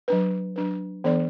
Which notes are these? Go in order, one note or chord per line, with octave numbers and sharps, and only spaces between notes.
F#3 D4 B4
F#3 D4 B4
E3 B3 D4 A4 D5